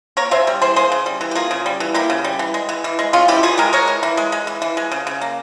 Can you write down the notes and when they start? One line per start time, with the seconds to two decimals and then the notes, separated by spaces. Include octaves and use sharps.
0.17 A#3 A#4 C#5
0.31 C#3 C5 E5
0.47 G3
0.62 E3 G#4 C5
0.76 A#3 G#4 C5
0.92 C#3
1.06 G3
1.21 E3
1.31 G4
1.35 A#3 F4 G#4
1.51 C#3
1.66 G3
1.80 E3
1.94 A#3 E4 G4
2.10 C#3
2.25 G3
2.39 E3
2.54 G#3
2.69 E3
2.84 E3
2.99 G#3
3.13 G#3 C#4 F4
3.28 E3 E4 G4
3.43 E3 F4 G#4
3.58 G#3 G4 A#4
3.73 G#3 A#4 C#5
3.88 E3
4.03 E3
4.17 G#3
4.32 G#3
4.47 E3
4.62 E3
4.77 G#3
4.92 C#3
5.07 C#3
5.21 A#3